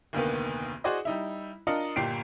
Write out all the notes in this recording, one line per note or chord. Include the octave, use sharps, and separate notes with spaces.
F1 D2 D#3 A#3 B3
F#4 G#4 C5 D5 D#5
G3 D#4 E4
D4 F4 A#4 D#5 C#7
G1 A#2 G4 C7 D7